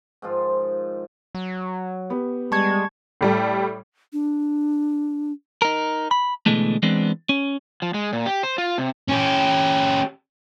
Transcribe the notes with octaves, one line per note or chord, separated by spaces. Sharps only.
G#2 D#3 F3 F4
F#3
B3 G4
G3 G#3 A5 C#6 G#6
A2 G3 A3
D4
D#4 A#4
B5
B2 D3 E3 G#3 A3
E3 G#3 B3 C4 D4
C#4
F3
G#3
A#2
G4
C5
F4
C3
C#4 G4